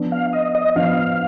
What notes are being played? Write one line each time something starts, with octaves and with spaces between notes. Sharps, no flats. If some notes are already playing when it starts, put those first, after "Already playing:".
Already playing: F3 B3 D4
F5
D#5
D#5
F3 B3 D4 F5